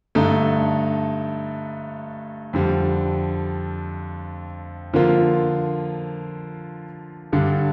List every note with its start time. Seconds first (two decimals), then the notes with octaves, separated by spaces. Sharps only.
0.15 G2 D3 A3 D#4
2.53 F2 D3 G3
4.93 D3 F3 A#3 F4
7.32 G2 D3 G3